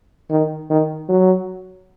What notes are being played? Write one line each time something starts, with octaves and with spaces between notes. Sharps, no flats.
D#3
D#3
F#3